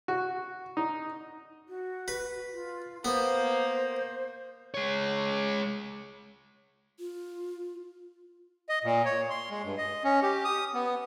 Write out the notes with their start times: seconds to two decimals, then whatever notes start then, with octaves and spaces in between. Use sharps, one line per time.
0.08 F#4
0.77 D#4
1.69 F#4
2.08 B4
2.54 F4
3.05 A#3 B3 C5
4.74 G#3 C#5
6.99 F4
8.69 D#5
8.84 A#2
9.05 C#5
9.30 C6
9.50 G#3
9.64 G2
9.77 D#5
10.04 C#4
10.23 G4
10.45 D#6
10.74 B3